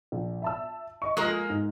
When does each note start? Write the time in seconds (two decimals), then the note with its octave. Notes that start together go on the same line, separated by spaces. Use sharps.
0.12 A#1
0.42 E5 A5 E6
1.02 D#5 C#6
1.17 F3 G#3 A#3 A#4 D#6
1.50 G#2